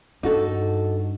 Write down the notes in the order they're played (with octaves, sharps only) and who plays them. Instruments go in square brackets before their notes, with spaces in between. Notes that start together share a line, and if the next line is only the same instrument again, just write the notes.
[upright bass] G2 [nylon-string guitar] D#4 F#4 A4